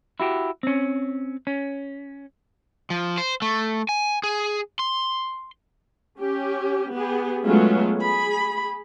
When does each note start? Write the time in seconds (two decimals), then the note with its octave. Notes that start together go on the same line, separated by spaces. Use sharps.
0.20 E4 F#4 G4
0.63 C4 C#4
1.47 C#4
2.90 F3
3.18 C5
3.42 A3
3.89 G#5
4.23 G#4
4.79 C6
6.20 C#4 G4
6.93 B3 G4 G#4
7.45 F#3 G#3 A3 B3 C#4 F4
7.99 G#4 B5